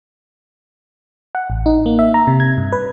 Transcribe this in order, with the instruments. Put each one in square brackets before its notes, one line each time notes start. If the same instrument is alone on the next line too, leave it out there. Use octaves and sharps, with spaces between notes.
[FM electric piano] F#5
A1
D#4
A#3
E5
A#5
C3
G#6
G2
B4